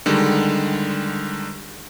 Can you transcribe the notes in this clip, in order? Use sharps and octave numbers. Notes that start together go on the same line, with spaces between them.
D3 D#3 G3 G#3